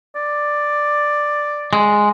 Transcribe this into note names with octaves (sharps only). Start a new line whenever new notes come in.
D5
G#3